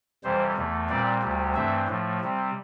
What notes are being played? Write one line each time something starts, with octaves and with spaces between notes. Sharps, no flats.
F2 C3 E3 G3 C5
E2 E3 A3
A#2 G3 C4 D5
D2 C3 G3
G2 E3 A3 C4 E5
A2 F3 A3
C3 G3 C4